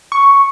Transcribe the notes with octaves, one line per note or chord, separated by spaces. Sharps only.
C#6